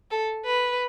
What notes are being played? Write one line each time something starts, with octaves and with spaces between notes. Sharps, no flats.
A4
B4